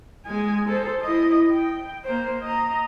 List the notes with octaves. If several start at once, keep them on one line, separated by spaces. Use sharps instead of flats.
G#3 G#5
A4 C5
E4 D#5
G5
A#3 C5
D#5 A#5